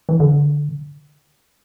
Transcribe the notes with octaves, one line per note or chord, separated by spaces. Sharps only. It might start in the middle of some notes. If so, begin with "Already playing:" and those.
E3
D3